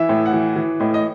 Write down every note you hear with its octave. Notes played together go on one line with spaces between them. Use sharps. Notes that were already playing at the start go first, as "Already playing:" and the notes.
Already playing: E3 E5
A2
F#5
E3
E3
A2 D#5
D#5